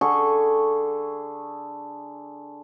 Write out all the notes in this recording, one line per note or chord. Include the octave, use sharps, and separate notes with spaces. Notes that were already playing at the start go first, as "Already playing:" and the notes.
D3 G#4 A4 C#6